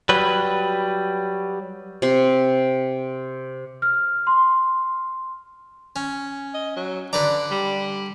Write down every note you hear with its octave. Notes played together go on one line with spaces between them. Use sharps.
F#3 G3 B4
C3 C6
F6
C6
C#4
D#5
F#3
D3 B4 D5 A#5
G3